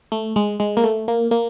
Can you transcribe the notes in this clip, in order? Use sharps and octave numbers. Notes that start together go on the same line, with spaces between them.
A3
G#3
G#3
A#3
A3
A#3
A#3